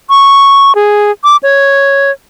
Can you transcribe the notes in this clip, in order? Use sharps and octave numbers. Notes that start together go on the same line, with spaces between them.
C#6
G#4
D6
C#5